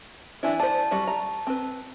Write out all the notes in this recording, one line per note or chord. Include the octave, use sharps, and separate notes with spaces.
E3 D4 E4
C5 D5 A5
G3 F#4
A#5
C4 B4